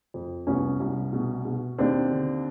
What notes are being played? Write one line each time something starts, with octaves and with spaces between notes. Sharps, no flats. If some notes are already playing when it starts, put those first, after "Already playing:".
F2
C2 B3 C#4
C2
B2
B2
D#2 C4 D4
D3